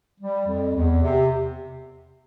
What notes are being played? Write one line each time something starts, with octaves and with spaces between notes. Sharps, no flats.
G3
F2
E2
C3